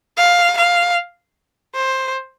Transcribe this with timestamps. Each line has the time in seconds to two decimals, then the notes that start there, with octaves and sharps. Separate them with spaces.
0.17 F5
0.57 F5
1.75 C5